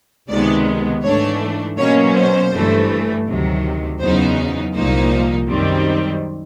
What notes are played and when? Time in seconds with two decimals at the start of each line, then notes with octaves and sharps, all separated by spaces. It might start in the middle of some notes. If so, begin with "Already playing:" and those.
0.29 C#2 C3 D#3 G#3 B3 D5
1.03 G#2 E3 A3 D4 C#5
1.77 B2 F#3 A#3 C#4 C#5
2.15 C5
2.52 G1 G2 E3 A3
3.26 D2 C3 D#3 F#3
4.00 E2 C#3 F#3 B3 D#4 C5
4.75 C2 A#2 F3 A#3 D#4 C5
5.49 F#2 D#3 G3 C4